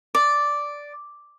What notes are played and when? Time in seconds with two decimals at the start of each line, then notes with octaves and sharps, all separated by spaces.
0.15 D5